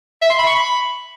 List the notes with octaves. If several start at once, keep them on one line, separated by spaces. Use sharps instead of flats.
E5
C6
B5
C#6
B5